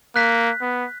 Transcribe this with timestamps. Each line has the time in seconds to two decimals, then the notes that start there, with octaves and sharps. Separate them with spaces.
0.16 A#3 F#6 B6
0.61 B3